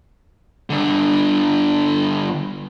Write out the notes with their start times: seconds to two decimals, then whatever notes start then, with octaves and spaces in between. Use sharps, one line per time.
0.70 G2 D3